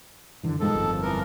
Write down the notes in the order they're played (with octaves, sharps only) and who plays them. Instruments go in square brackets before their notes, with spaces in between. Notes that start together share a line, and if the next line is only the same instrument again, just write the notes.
[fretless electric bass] F#2 D3 E3
[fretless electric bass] G2 B2 G#3 [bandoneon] D#3 F3 A4
[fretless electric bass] G1 F2
[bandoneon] E3 F3 A#4